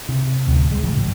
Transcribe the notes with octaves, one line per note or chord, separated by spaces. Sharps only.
C3
A1 D2 C3
G3 G#3
A1 C#3 F3
G#1 G#2